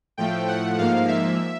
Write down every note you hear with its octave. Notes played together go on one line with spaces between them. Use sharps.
A2 F3 A3 G5
F#5
G#2 F3 A#3 F5
E5